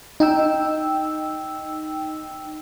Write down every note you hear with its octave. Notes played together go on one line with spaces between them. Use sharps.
D#4 G5 E6